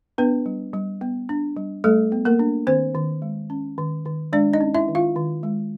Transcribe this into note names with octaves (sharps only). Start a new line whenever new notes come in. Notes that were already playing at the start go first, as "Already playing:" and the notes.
B3 D4 B4
G3
G3
B3
D4
G3
G3 A3 A4
B3
A#3 A#4
D4
D#3 C4 C5
D#3
G#3
C#4
D#3
D#3
G#3 D4 D5
D#4 D#5
C#4
E4 E5
D#3
F4 F5
D#3
G#3